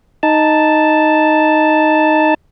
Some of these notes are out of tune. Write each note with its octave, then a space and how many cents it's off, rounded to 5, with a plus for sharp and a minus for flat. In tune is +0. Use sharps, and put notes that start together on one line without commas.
D#4 +0 A5 +0